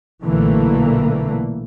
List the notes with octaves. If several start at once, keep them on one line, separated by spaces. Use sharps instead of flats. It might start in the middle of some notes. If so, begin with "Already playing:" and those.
B1 A#2 D3 E3 A3 A#3